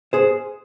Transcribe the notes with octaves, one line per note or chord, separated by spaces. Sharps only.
G#4 C5